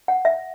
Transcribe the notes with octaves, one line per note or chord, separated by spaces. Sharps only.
F#5
E5